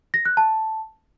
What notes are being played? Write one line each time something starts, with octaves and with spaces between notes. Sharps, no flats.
A#6
F#6
A5